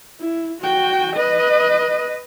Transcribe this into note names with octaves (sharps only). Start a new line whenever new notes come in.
E4
F#4 G5
B4 D#5